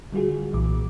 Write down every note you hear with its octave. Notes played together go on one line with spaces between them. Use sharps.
D3 G3 F4 F#4 G#4
B1 A#2 E3 D6